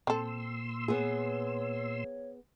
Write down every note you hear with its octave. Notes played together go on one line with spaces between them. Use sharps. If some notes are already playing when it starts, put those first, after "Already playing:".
A#2 C4 A4 C6 E6
B3 G#4 C#5